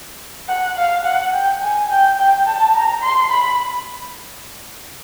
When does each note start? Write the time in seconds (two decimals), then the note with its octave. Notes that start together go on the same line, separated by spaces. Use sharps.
0.49 F#5
0.78 F5
1.05 F#5
1.34 G5
1.62 G#5
1.90 G5
2.18 G5
2.46 A5
2.74 A#5
3.03 C6
3.30 B5